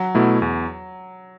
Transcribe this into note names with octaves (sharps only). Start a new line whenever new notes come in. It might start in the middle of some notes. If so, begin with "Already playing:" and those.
Already playing: F#3
B2 A3 E4
E2